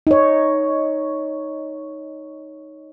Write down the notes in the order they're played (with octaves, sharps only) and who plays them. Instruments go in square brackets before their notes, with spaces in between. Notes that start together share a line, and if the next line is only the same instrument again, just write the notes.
[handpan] D#4 C#5